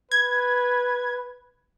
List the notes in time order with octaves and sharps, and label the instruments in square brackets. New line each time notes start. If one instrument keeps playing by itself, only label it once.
[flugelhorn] B4 [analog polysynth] G#6